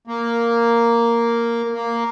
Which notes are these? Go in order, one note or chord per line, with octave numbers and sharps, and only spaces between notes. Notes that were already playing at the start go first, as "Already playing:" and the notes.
A#3
A#3